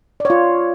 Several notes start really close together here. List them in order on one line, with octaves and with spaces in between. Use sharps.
D5 C#5 F4